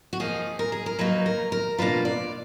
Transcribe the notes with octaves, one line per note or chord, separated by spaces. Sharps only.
F#4
F3 A#3 D#4 G#4
A#4
G#4
A#4
F#3 A#3 D#4 B4
A#4
A#4
B2 A#3 D4 F4 B4
D5